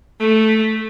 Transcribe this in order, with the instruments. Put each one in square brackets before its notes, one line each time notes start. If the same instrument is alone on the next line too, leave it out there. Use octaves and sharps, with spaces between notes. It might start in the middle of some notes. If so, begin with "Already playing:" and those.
[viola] A3